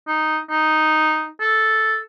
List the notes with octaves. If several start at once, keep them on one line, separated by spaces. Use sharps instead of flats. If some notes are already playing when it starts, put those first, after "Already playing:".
D#4
D#4
A4